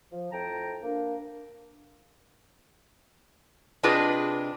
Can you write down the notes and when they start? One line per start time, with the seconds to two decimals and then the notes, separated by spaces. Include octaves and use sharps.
0.11 F3
0.32 F2 A2 G5 A5 A#5
0.82 A#3 D4
3.83 C3 D4 F4 G#4 B4 D#5